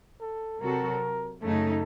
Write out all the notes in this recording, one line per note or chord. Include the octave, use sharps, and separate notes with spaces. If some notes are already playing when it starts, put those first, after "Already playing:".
A4
C3 F#3 C4 F#4 A4 A#4
F#2 C#3 A3 D#4 A4